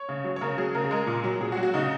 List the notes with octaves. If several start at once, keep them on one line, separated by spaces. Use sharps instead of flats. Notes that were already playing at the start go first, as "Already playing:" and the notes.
Already playing: C#5
C#3
F#3
C#5
C#3 A#4
F#3 G#4
C#3 A#4
G#4
G#3 A#4
A#2
F#3
A#2 G#4
F#4
F#3
F#4
C#3 D#4